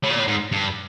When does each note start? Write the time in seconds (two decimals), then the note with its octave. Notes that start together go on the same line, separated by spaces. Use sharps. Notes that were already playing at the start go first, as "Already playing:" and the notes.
0.03 A2
0.10 A#2
0.19 A2
0.27 G#2
0.52 G2